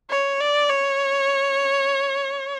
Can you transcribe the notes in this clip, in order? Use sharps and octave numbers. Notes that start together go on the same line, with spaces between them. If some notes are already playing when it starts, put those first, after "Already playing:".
C#5
D5
C#5